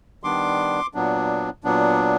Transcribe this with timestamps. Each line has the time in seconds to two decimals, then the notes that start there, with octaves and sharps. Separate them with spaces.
0.23 D#3 G3 B3 D4 C6 D6
0.94 A#2 F#3 B3 D4
1.64 A#2 F#3 B3 D4